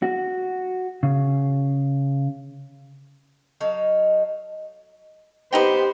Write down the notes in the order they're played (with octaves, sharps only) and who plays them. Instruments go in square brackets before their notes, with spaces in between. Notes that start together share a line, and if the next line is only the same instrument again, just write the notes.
[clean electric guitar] F#4
C#3
[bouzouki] F#3 D#4 A4 F5
[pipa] B3 D#4 G5 [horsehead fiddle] G4 C5